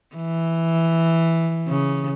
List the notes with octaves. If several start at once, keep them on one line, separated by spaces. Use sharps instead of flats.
E3
C#3